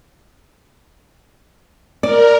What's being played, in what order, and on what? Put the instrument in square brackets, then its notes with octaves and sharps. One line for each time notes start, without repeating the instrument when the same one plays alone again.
[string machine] A#4 [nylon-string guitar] D5